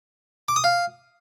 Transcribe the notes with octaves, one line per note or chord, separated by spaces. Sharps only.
D6
D#6
F5